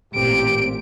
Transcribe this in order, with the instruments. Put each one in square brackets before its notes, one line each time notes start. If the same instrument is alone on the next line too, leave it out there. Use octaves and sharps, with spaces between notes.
[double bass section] A1 A#2 C4 [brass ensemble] G4 [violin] D7